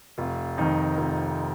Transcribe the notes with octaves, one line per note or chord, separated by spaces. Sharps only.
F1 F4
F2 D#3 D#4
F1 F4